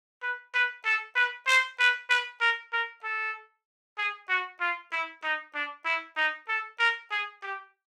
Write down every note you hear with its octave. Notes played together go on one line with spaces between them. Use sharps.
B4
B4
A4
B4
C5
B4
B4
A#4
A#4
A4
G#4
F#4
F4
E4
D#4
D4
E4
D#4
A4
A#4
G#4
G4